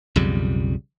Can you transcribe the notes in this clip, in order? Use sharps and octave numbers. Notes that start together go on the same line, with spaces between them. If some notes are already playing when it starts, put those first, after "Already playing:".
B1 F2 C#3 G3